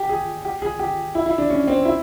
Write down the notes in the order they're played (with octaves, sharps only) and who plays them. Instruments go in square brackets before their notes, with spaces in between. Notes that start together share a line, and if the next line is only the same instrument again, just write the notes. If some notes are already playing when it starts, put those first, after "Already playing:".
Already playing: [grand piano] G4
G#4
G4
G#4
G4
E4
E4
D4
C#4
C4
E4